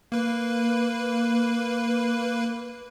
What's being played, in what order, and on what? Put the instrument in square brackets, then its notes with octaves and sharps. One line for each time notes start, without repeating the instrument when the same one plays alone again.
[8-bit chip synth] A#3 B4